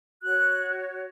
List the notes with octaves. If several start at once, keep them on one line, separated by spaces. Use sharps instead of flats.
F#4 C#5 F#6